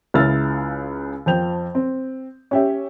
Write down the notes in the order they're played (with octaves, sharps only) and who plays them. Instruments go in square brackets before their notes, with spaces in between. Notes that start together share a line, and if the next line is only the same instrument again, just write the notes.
[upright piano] C#2 C#3 E4 E6 F6 A6
F2 F3 G5 G6 F7
C4
C#4 G4 E5